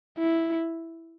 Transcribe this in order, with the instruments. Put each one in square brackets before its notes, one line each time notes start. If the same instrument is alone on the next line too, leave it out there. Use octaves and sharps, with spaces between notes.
[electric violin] E4